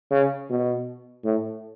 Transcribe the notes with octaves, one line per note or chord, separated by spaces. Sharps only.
C#3
B2
A2